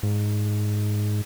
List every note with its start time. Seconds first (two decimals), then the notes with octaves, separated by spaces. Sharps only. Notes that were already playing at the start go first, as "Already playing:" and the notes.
0.03 G#2